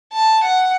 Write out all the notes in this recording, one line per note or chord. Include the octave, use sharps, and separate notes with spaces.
A5
F#5